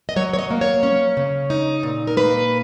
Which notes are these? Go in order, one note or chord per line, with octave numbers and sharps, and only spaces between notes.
D#5
F#3 C#5
C#5
D#5
A#3
C#5
C#4
C#3
D#4
A#2
A#4
A#3 B4